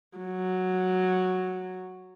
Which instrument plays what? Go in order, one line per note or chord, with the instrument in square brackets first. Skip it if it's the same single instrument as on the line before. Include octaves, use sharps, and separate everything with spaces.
[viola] F#3